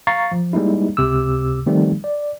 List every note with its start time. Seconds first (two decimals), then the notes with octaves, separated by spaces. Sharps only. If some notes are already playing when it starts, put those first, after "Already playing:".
0.07 F5 A#5 C#6 A6 C7
0.32 F3
0.53 G3 G#3 A#3 D#4 E4
0.97 C#2 C3 D6 E6
1.66 D#3 F3 G3 A3 C4 D#4
2.04 D5